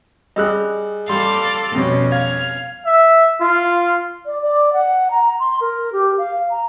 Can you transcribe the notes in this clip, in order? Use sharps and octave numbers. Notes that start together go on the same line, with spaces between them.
G3 G#4 D#5 E6 F#6
G3 A4 F5 C6 D6
F2 B2 G3 C#4
F5 F6 G#6
E5
F4
D5
D5
F#5
A#5
C6
A#4
G4
F5
A#5